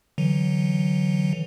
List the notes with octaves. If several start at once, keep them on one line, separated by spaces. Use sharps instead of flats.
D3 E3 F#3